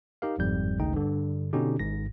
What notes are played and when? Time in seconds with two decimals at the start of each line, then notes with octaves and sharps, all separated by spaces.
0.22 D#4 G4 A#4 F5
0.38 G1 F2 G#2 G3 G6
0.79 G#1 D2 C#3 D#4 G5
0.93 G2 D3
1.53 B2 D3 C#4 D#4 G4
1.79 G#1 G#2 A#6